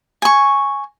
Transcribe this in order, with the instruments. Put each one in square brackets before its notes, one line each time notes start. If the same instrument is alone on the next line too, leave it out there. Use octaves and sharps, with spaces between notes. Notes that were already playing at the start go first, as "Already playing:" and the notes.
[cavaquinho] G#5 C#6